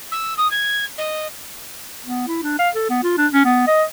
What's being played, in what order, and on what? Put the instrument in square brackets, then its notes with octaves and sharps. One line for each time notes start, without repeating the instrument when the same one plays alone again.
[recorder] E6
D#6
G#6
D#5
[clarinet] B3
E4
D4
F5
A4
B3
F4
D4
C#4
B3
D#5